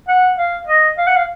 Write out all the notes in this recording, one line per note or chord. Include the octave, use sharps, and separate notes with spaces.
F#5
F5
D#5
F5
F#5
F5